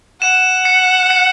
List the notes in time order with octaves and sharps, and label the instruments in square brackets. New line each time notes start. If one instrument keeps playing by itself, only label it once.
[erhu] F#5 [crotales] E7
[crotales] C#7
C#7